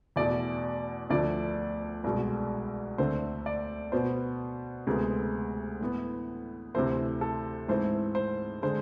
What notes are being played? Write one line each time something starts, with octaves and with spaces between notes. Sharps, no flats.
E2 B2 A3 D5
D2 D3 F3 A3 D5
C2 B2 G#3
D2 D3 A3 C4 C5
D5
B2 B3 C5
D2 C3 G#3 B3
A2 E3 B3
D2 C3 E3 A3 C4 C5
A4
G#2 E3 A3 C4 C5
C5
D3 G#3 C5